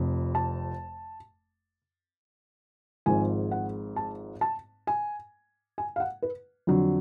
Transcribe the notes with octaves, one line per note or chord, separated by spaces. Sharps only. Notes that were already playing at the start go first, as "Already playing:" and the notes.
Already playing: F1 F2
A5
G#1 G#2 F3 G#5
F#5
A5
A5
G#5
G#5
F5
F#5
B4
F2 D3 F#3